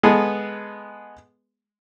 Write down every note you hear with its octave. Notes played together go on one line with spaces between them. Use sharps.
G#3 B3 G#4 A4 B4